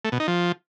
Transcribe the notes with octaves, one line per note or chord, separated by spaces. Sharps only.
A3
B2
D#4
F3